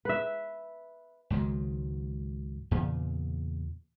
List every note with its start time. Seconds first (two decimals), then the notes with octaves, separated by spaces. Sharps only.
0.05 B4 E5
1.30 C#2 G#2 D#3 F#3
2.71 E2 A#2 C#3